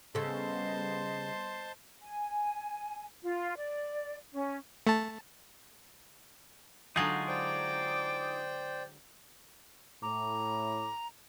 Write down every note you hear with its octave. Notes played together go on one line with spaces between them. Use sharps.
C#3 G3 B3 A4 C5 D#5 A5 C6
G#5
F4
D5
C#4
A3 A5
D3 F#3 G#3 D#4 F4 G#4
C5 D5 G5 D6
A2 A#5 D6